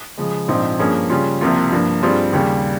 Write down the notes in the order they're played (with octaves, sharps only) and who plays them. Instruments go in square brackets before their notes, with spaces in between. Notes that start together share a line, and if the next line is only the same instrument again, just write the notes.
[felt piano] C#3 F3 G#3
A#1 G#2 F3 C4 D#4
G2 F3 A#3 C#4 G#4
C#3 G3 C#4 F4
C2 C3 F3 A#3 F4
G2 F3 A#3
G2 G3 C4 F4 G#4
D#2 C#3 G3